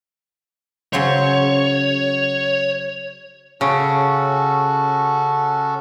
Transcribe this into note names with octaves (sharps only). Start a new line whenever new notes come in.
C#3 F#3 C5 C#5
C#3 C#4 F#4 A4